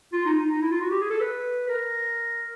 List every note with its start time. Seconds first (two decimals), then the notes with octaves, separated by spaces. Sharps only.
0.13 F4
0.25 D#4
0.39 D#4
0.51 D#4
0.61 E4
0.71 F4
0.81 F#4
0.90 G4
1.00 G#4
1.10 A4
1.20 B4
1.68 A#4